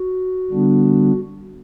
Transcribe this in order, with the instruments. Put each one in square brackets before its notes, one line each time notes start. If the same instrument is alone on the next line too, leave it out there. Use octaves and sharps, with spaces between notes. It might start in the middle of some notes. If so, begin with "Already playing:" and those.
Already playing: [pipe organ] F#4
D3 G3 B3 D4